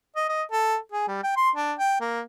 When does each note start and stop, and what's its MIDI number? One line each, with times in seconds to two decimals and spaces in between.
0.16 0.25 75
0.29 0.43 75
0.51 0.77 69
0.92 1.06 68
1.08 1.21 55
1.23 1.35 79
1.37 1.50 84
1.56 1.73 62
1.79 1.97 79
2.01 2.21 58